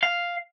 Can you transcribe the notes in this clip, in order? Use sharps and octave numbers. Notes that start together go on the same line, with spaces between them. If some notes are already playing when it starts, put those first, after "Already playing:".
F5